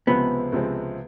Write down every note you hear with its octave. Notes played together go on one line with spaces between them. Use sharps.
C#2 C3 F3 G#3 B3 C4
C#2 C3 F3 G#3 C4